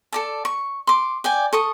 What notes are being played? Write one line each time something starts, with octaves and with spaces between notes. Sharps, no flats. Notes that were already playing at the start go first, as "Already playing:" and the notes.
A4 D5 A5
C#6
C6 D6
D5 G5 G#5
A4 C#6 D#6